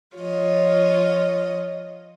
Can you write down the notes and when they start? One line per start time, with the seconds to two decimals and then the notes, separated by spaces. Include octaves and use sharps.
0.17 F3 F4 C#5 D#5